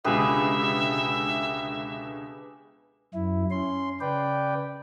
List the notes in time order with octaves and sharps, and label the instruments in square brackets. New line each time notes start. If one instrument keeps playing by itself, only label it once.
[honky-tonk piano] C#2 B2 D3 [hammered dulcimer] G4 G#4 B4 [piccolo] E5
[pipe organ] F#2 E4
C#4 C6
C#3 B4 D5 G5